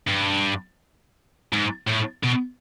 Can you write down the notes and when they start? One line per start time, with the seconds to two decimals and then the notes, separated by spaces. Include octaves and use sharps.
0.07 G2
1.53 G#2
1.88 A2
2.24 B2